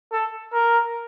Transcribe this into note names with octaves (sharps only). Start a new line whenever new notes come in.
A4
A#4